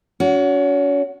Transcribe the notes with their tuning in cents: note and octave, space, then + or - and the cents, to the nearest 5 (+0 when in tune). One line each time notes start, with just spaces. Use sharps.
C#4 +35 F#4 -5